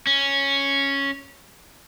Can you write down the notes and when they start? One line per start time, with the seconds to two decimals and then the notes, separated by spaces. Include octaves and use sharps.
0.07 C#4